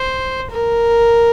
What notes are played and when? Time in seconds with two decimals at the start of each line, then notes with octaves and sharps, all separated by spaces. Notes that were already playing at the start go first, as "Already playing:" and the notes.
Already playing: C5
0.51 A#4